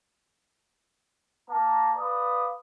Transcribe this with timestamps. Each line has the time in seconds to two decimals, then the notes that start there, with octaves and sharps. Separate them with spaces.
1.50 A#3 A5 A#5
1.97 B4 D5 F5 D#6